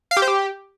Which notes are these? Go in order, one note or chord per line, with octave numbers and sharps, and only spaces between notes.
F5
G4
C5
G4